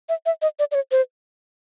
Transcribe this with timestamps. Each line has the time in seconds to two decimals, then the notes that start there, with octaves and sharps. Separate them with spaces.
0.09 E5
0.26 E5
0.42 D#5
0.59 D5
0.71 D5
0.75 C#5
0.91 C5